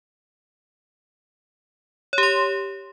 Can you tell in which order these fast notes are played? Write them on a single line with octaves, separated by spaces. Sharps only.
C#5 G4 C6